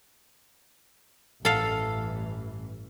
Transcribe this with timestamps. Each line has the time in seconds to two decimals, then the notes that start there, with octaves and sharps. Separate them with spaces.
1.45 A1 G2 E3 A4 F5